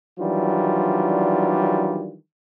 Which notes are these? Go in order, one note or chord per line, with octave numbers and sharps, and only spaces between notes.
D#3 E3 F#3 G3 D4 F4